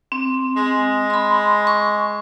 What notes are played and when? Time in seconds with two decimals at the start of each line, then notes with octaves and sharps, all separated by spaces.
0.12 C4
0.57 G#3
1.10 B5 C6
1.67 C#6